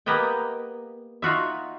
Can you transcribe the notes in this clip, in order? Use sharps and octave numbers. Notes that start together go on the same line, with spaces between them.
A#3 B3 G4 D#5 G5
D#4 F4 F#4 E5